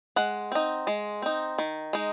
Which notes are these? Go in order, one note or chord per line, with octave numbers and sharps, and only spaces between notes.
G#3 F#5
C4 D#4
G#3
C4 D#4
D#3
G#3 D#4